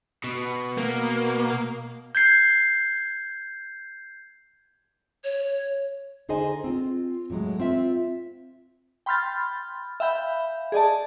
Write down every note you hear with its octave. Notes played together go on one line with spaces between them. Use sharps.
B2
A#3
G6 G#6 C7
C#5
D3 D#4 G#4 C5 D#5 G#5
C4 F4
A2 E3 F#3 G#3
C4 F4 E5
G5 B5 C6 F6 G6 A6
E5 F5 G5 B5 G6
G#4 D5 D#5 A5